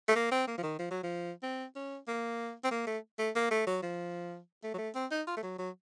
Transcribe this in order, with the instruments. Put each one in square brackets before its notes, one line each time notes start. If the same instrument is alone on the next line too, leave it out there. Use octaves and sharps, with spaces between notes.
[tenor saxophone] A3
A#3
C4
A#3
F3
D#3
F3
F#3
F3
C4
C#4
A#3
C4
A#3
A3
A3
A#3
A3
F#3
F3
A3
F#3
A3
C4
D#4
F4
A3
F#3
F#3